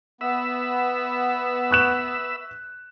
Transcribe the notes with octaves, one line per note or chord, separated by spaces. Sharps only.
B3 B4 E5 E6
C#6 F#6 E7